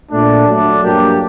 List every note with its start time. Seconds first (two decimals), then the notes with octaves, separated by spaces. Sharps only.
0.10 A#2 A3 D4
0.46 F#3 A3 D4
0.82 G2 F#3 A#3 D4 G4